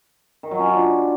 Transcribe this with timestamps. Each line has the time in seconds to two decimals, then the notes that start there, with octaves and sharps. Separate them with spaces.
0.43 D#3
0.51 F#3
0.59 C#4
0.67 F4
0.75 D4